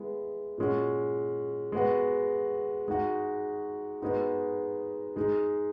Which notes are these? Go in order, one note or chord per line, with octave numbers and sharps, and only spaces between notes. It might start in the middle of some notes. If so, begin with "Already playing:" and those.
Already playing: G#3 B3 E4
A#2 G#3 C#4 F#4
G#3 B3 F#4
G#3 D#4 F#4
G#3 B3 D#4 F#4
G#3 D#4 G#4